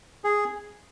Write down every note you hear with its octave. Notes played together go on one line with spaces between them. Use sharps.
G#4